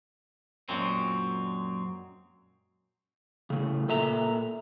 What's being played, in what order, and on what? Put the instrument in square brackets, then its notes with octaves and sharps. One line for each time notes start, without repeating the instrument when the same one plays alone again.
[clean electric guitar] F#2 A#2 F#3 G#3 C4
[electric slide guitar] A2 C#3
A#2 A4 E5 A#5